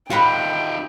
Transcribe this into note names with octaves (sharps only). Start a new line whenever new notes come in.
D#4 F4 F#4 A#4 B4 G5